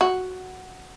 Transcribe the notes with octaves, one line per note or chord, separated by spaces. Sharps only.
F#4